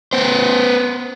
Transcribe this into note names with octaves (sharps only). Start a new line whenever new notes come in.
B3 C5